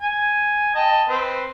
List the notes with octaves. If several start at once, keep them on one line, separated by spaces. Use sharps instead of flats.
G#5
D#5 G5 A5
C4 B4